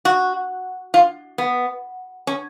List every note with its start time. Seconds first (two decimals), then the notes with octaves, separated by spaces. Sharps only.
0.05 F#4
0.94 F4
1.38 B3
2.27 C#4